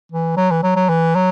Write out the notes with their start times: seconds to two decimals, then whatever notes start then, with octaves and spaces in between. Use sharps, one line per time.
0.12 E3
0.37 F#3
0.51 E3
0.63 F#3
0.76 F#3
0.89 E3
1.15 F#3